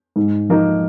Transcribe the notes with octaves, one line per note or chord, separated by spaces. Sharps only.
G#2
F3 A#3 D#4